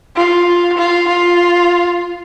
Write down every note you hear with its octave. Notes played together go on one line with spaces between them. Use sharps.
F4
F4
F4